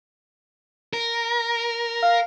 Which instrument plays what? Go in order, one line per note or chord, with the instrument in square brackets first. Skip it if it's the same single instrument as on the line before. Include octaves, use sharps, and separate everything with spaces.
[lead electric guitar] A#4
[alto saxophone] F5